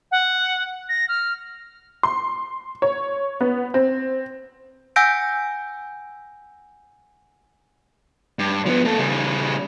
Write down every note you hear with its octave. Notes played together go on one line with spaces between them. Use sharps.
F#5
A#6
F6
C6
C#5
B3
C4
F#5 G#5 E6 G6 A#6 D7
G2
F3 B3
A#3 A4
C#3 G3